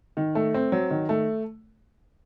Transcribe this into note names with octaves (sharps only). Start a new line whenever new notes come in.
D#3
A3
C4
F#3
D#3
A3